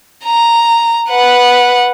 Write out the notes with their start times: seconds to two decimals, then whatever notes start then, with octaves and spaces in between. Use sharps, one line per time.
0.25 A#5
1.10 B4 F#5